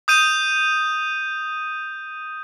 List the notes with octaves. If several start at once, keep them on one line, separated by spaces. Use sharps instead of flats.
D#6 G6 D#7